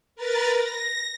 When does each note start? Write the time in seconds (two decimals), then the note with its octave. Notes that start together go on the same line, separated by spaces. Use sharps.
0.15 A#4 B4 A#5 A6
0.55 A#6